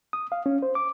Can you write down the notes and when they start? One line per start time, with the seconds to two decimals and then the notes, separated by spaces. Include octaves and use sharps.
0.13 D#6
0.32 F5
0.46 C#4
0.62 C5
0.75 D6